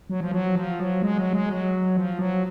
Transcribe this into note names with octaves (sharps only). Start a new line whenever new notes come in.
F#3
F3
F#3
F3
F#3
G#3
F#3
G#3
F#3
F3
F#3